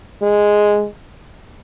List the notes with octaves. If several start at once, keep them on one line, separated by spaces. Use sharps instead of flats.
G#3